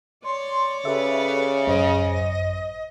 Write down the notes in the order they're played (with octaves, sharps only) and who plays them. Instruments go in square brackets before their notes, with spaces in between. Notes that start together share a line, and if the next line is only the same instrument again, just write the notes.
[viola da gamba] C#5 D5 [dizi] C6
[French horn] C#3 [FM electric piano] G4 A4 E5 [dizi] B4
[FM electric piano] A1 F#2 C5 [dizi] D#5